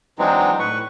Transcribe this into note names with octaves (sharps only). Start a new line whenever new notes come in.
E3 F#3 G#3 C4 D4 D#4
A2 B4 C#6